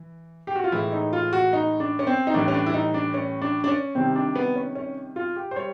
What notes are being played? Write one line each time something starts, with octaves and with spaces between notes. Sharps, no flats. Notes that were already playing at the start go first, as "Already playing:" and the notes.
Already playing: E3
G4
F#4
F4
A2 E3 G#3 E4
D#4
F4
F#4
D#4
D4
C#4
C4
D#4
A2 E3 G3 D4
C#4
D4
E4
D#4
D4
C#4
D4
D4
C#4
C3 D#3 G3 C4
D4
B3
C#4
C#4
F4
G4
C5
G3 C#5